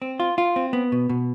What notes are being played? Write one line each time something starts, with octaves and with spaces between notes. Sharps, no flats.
C4
F4
F4
C4
B3
B2
B2